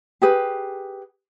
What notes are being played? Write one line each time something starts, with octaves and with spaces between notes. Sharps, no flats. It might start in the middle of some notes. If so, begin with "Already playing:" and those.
G4 G#4 B4